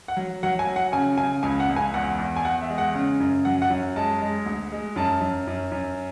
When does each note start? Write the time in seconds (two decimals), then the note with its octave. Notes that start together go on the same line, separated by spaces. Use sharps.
0.08 F#5
0.17 F#3
0.43 F#3 F#5
0.59 G#5
0.67 F#3
0.76 F#5
0.92 C#3 G#5
1.18 C#3 G#5
1.43 C#2 G#5
1.60 F#5
1.69 C#2
1.76 G#5
1.94 E2 F#5
2.18 E2
2.36 G#5
2.45 E2 F#5
2.61 E5
2.70 G#3
2.78 F#5
2.94 C#3
3.20 F#2
3.45 F#3 F#5
3.62 F#5
3.70 F#2
3.96 G#3 A5
4.21 G#3
4.46 D2
4.72 G#3
4.96 F#2 A5
5.21 F#2
5.47 F#2
5.72 F#2